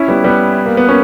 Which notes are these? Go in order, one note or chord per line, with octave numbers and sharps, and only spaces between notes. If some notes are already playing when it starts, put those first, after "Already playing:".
Already playing: C#4 E4
G3 B3
G3 B3
A#3
B3
A#3 C#4